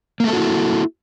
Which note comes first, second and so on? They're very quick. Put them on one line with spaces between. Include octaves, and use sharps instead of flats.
A#3 A3 A4 F#4 E4